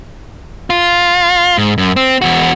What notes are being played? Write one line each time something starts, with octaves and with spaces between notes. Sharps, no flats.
F4
G#2
F#2
C4
E2 F#4